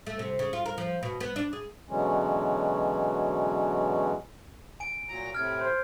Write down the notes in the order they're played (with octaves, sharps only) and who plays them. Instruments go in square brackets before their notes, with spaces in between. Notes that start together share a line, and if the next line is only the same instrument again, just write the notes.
[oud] A3
C3
C#3
F4
A#4
F3
B2
B3
D4
G#4
[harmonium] B2 D3 E3 F#3 G#3 C#4
[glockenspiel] G#5 D7
[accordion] A#2 F#3 A#5
[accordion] A2 C3 [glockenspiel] F6 G#6
[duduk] C5